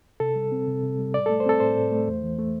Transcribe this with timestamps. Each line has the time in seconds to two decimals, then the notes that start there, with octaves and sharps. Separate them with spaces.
0.20 C3 A4
0.36 G3
0.52 C4
0.67 C3
0.83 C3
0.99 G3
1.14 A2 D5
1.26 A3 A4
1.40 C5
1.46 C4 A4
1.60 A2 C5
1.77 A2
1.92 A3
2.07 E2
2.23 E3
2.39 A3